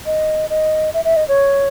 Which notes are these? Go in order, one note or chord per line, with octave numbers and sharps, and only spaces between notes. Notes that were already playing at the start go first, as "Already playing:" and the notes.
D#5
D#5
E5
E5
D#5
C#5